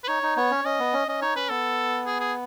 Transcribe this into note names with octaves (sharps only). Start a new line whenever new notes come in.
B4
D#4 C#5
D#4
B3 C#5
C#4
C#4 D#5
B3
C#4
C#4 D#5
D#4 C#5
C#4 B4
B3 A4
G#4
G#4